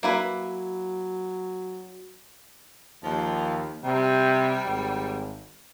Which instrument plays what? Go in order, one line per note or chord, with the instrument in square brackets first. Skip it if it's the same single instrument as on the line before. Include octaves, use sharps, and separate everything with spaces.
[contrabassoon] F#3 [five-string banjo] A#3 E4 B4
[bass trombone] D#2 [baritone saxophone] F3
[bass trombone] C3 [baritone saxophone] G3
[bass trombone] G#1